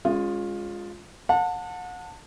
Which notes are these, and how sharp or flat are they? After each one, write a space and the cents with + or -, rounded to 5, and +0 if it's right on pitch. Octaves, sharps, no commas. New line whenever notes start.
G#3 -15 C#4 +0 F4 +15
F#5 -35 A5 +20